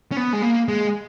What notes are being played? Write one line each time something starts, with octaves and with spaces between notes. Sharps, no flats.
C#4
B3
G#3
A#3
G#3